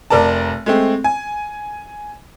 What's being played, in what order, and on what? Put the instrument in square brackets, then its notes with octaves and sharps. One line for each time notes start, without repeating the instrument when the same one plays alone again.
[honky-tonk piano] F1 A#4 D5 A5
G#3 A3 C4
G#5